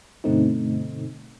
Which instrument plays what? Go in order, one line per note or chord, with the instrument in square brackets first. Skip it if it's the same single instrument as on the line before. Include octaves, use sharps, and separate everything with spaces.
[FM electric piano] G2 B2 D3 A3 C4 D#4